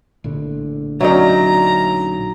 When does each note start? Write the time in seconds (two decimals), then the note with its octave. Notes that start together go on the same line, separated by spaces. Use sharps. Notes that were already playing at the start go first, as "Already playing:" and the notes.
0.24 A#1 A2 D3
1.01 F#3 C#4 D#4 D5 E5 A#5